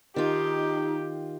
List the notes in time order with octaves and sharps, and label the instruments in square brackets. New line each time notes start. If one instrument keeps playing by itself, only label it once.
[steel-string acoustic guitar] D#3 F4 [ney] D#4 [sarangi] G4